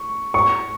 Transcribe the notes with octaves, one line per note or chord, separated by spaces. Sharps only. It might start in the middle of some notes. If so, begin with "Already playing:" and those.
Already playing: C#6
C#6